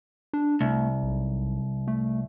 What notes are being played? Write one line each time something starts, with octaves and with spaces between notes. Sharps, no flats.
D4
C2 A3
B1
A3